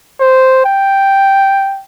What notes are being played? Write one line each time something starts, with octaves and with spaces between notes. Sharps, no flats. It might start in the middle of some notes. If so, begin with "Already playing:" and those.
C5
G5